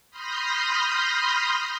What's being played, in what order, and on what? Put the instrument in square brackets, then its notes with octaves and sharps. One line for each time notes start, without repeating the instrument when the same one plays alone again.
[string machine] B5 C6 D#6 F6 G6 A#6